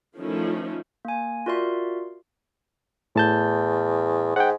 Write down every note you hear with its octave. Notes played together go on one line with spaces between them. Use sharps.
D#3 F3 A3 C#4 D#4 E4
A#3 G#5
F4 F#4 A#4 D5 E5 C6
E2 A2 A5 G6
G#2 F#5 G5